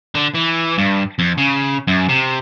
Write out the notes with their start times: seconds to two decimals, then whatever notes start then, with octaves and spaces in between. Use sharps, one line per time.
0.15 D3
0.35 E3
0.78 G2
1.19 F2
1.38 C#3
1.87 F#2
2.09 C3